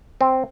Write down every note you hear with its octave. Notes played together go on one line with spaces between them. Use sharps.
C4